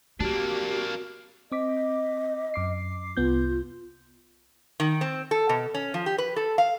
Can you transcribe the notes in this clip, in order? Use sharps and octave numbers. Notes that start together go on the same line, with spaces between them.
A#3 C4 D4 F#4 G4
C4 D#5 D6 B6
F#2 D6 C7
C2 B3 F4 G6
D#3
C4
A4
B2
C#4
F3
G4
B4
A4
F5